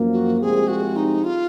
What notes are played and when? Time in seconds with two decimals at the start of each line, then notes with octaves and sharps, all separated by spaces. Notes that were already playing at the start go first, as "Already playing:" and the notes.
Already playing: F#2 F3 A#3
0.13 F#4
0.40 C2 C3 F3 G#3 C4 G#4
0.68 F#4
0.96 D#4
1.24 F4